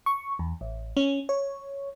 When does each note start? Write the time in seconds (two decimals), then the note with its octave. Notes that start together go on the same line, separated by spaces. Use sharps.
0.06 C#6
0.39 E2
0.61 A1
0.97 C#4
1.29 C#5